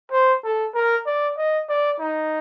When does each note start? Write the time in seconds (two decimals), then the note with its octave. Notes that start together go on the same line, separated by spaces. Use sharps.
0.12 C5
0.44 A4
0.74 A#4
1.06 D5
1.38 D#5
1.69 D5
2.00 D#4